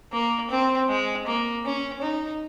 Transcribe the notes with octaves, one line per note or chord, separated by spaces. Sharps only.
A#3
C4
G#3
A#3
C#4
D#4